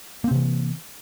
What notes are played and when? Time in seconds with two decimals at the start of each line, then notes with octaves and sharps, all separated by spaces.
0.24 A#3
0.28 C4
0.31 C3
0.34 E3